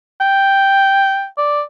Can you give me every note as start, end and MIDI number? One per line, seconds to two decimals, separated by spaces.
0.21 1.26 79
1.38 1.62 74